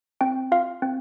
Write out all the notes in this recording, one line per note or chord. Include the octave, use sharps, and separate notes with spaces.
C4 G5
F4 F5
C4